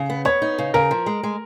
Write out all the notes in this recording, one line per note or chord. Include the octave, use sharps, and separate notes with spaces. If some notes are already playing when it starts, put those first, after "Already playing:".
Already playing: C#3
B3
B3 C#5
D#4
C#3
C#3 A#4
F3
G#3
G#3